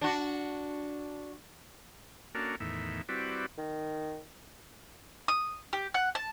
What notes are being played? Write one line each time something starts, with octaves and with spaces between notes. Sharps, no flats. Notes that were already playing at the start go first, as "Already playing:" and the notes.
D4 F#4
A#3 C#4 D4 F#4 A4 A#4
E2 A2 D#3 E5
G3 C4 E4 F#4 B4 D5
D#3
D#6
G4
F#5
A5